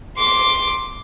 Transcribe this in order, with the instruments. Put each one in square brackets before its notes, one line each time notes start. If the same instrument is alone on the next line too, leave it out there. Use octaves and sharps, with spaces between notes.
[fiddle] C6 D6